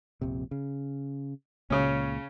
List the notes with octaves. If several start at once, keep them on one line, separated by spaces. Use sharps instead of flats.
A#1 F2 C3
C#3
C#2 A#2 C#3 C#4